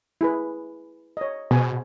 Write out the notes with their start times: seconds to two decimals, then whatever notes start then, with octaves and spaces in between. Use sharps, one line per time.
0.21 E4 G#4 B4
1.17 C#5 D#5
1.51 B2 G#4 C5 G#5